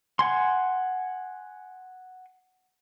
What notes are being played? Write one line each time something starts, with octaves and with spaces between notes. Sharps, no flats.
F#5 G#5 C6